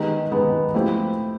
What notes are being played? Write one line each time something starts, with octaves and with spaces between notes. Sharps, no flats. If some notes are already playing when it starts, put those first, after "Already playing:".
Already playing: D#3 G#3 B3 D#4 G4
D#3 G#3 B3 D#4 G4
F3 A3 C4 E4 G4